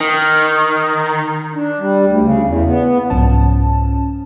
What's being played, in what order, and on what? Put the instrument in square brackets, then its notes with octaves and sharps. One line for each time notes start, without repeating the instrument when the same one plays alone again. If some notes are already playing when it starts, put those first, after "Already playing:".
[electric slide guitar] D#3
[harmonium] D4
G3
D2
C#3
E2
B3
[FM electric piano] C2 G#2 F3 C#4 A5